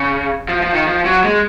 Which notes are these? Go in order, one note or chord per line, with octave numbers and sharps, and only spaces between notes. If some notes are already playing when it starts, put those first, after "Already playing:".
Already playing: C#3
F3
F3
D#3
F3
F#3
G#3